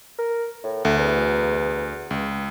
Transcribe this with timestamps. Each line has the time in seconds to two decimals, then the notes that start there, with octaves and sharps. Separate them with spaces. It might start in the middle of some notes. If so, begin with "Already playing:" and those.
0.19 A#4
0.63 A2
0.85 D2 A3
0.98 E2
2.11 C#2